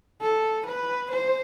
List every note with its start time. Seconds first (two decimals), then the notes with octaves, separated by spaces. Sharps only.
0.21 A4
0.66 B4
1.11 C5